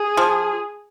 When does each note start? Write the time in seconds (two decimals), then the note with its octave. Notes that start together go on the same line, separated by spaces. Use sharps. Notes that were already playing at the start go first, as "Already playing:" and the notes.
Already playing: G#4
0.17 F3